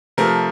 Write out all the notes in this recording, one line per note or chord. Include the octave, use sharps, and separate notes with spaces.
C3 F3 A3 A#4